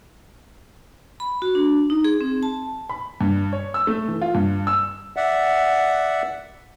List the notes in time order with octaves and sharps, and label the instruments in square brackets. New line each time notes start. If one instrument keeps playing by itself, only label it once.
[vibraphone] B5
F#4
D4
D#4
G#4
C4
A5
[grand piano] B5
G2
C#5
E6
A3
E3
F4
G2
E6
[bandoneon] D5 E5 F#5